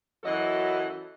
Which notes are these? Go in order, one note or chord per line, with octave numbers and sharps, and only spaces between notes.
F#2 E3 F#3 A4 D#5